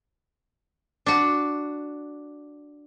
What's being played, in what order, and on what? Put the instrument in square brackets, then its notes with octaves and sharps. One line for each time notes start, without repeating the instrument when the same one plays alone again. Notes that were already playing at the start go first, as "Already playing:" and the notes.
[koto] D4 F#4